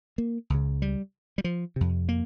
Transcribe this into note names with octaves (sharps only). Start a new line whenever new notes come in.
A#3
C#2 C#3
G3
G3
F3
F2 C3
A#3